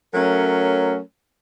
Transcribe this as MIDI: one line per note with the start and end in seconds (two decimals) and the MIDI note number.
0.14 1.00 54
0.14 1.00 57
0.14 1.00 61
0.14 1.00 70